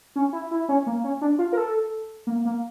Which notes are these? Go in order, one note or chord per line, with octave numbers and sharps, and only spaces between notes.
C#4
E4
E4
C#4
A#3
C#4
D4
F4
A#4
A4
A#3
A#3